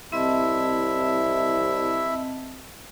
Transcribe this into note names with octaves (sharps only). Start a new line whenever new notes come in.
C2 C4 E4 D#5 E5 A5